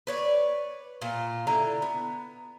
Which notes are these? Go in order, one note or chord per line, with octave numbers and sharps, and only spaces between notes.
B4 C#5 D5
A#2 F4
D3 E4 A#5
B3